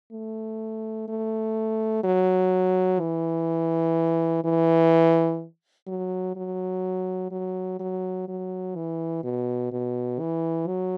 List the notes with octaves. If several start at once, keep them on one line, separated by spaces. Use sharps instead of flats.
A3
A3
F#3
E3
E3
F#3
F#3
F#3
F#3
F#3
E3
B2
B2
E3
F#3